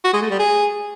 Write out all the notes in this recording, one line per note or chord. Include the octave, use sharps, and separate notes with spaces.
F#4
G#3
A3
G3
G#4